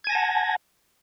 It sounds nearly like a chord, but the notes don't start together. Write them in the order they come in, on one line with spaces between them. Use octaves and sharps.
G#6 G#5 A#6 A5 F#5